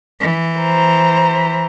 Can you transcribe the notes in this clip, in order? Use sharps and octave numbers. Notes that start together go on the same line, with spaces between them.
E3
C5 A#5